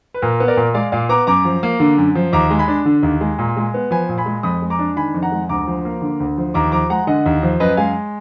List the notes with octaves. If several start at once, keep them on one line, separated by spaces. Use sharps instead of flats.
B4
A#2 A#4
B3
A#4 D5
A#2
G#3 D5 F5
A#2 D5 F5
B3 A#5 D6
F#2 A#5 D6
F3
A#3
D3
F#2
F3
D#2 A#5 D6
G#3
G#5 B5
D4
D3
D#2
G#3
A#2
G#3
B3
F3 G#5 B5
A#2
G#5 B5
G#3
F2 B5 D#6
G#3
A#5 D6
D4
D#3 G#5 B5
F2
F#5 A#5
G#3
D2 A#5 D6
F3
A#3
D3
D2
F3
D#2 A#5 D6
F3 A#5 D6
G#3 F#5 A#5
D3 D#5 F#5
D#2
F3
F#2 B4 D#5
G#3 F5 G#5